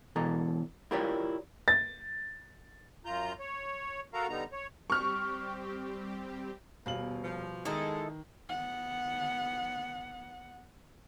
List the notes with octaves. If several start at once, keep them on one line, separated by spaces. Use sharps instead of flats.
B2 E3 A4 A#5
E4 F4 G4 A#4 C#5 D5
A6
F#2 F4 A#5 G6
C#5
F#4 A4 A#4 F5 A#5
D3 G3 B3 D#4 A#5
C#5
G3 C4 G4 C#6 F6
D#1 B2 F5 F#7
F3
D#3 G#3 E4 A4 D#5 A#5
B3 F#5